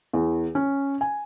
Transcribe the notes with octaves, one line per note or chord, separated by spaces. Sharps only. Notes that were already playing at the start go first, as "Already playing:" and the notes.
E2
C#4
G#5